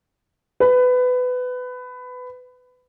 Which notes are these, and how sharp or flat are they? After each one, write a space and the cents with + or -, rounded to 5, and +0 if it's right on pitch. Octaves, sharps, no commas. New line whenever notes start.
B4 +20